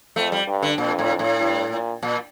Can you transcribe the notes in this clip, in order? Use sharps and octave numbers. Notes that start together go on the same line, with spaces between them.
F2 A3
G3
G2
D3
F2 A#2
A2
A2
G2
A#2
A#2